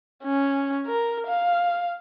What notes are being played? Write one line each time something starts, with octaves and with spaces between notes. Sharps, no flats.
C#4
A#4
F5